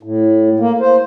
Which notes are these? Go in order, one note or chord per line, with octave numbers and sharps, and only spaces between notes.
A2
A#3
C5